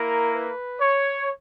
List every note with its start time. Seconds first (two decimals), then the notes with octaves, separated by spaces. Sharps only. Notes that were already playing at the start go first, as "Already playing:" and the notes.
Already playing: A#3 E4 A#4
0.33 B4
0.80 C#5